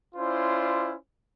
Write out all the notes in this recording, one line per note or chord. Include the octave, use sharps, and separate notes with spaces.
C#4 E4 F4 C5 D5